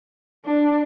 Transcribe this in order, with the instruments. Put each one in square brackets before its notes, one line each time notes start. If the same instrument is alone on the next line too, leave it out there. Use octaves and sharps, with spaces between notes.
[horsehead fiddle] D4